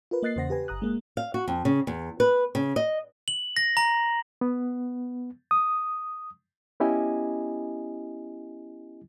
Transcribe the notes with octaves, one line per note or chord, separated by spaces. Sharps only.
F4 A#4 B4
A#3 D#5 F#6 A6 C7
E2 C#3 C5 F#5 A#6
G4 B4 G#5
G1 A#5 D#6 F#6
G#3 A#3
F5
F#4
F2
C#3
E2
B4
C#3
D#5
F#7
A#6
A#5
B3
D#6
B3 C#4 E4 G4 D#5 G#5